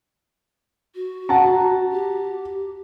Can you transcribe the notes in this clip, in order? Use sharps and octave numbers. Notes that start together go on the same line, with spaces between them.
F#4
F#5 A5 A#5
G4